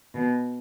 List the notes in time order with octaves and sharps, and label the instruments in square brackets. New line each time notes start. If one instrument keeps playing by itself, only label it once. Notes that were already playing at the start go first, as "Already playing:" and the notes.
[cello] B2